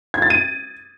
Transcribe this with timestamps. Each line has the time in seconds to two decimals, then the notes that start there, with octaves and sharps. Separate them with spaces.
0.14 G#6
0.22 A6
0.30 D#7